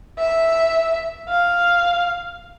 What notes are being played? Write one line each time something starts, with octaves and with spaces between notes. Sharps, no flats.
E5
F5